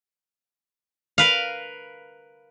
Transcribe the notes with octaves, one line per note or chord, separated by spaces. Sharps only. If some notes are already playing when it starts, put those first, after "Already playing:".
A#4 B4 F5